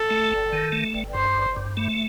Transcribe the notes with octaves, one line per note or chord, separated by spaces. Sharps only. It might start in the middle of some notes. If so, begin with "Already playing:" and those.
Already playing: A4
A3
G1
D#3
A3
G1
G2 C5
G1
G2
A3